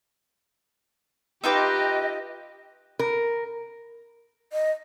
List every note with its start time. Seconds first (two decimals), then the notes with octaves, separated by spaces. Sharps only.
1.44 D#4 F4 G4 B4 D#5 E5 G5 D6
2.99 A#4
4.53 D#5